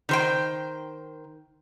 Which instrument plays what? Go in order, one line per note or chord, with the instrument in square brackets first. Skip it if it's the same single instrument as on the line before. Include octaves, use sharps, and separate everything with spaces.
[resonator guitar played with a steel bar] D#3 C5 G5